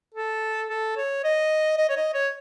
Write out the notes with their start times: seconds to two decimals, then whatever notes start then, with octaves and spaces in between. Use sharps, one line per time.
0.14 A4
0.69 A4
0.97 C#5
1.24 D#5
1.78 D#5
1.89 C#5
1.97 D#5
2.14 C#5